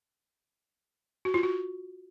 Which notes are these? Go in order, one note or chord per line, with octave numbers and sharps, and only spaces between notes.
F#4
F4
F#4